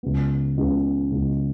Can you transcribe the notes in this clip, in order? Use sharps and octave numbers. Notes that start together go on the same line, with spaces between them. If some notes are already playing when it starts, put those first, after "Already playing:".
C#2 C#3 B3
C#2 C#3 B3
C#2 C#3 B3